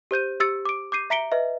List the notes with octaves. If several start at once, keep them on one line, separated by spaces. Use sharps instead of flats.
G4 C5 G6 D#7
G4 E6 A6 C#7
D6 D7
D6 G6 C7 D#7
E5 A#5 B6 C#7 D7 G7
B4 D#5 E5